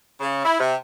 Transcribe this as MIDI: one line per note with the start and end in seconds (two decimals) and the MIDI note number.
0.20 0.41 49
0.45 0.60 64
0.60 0.74 48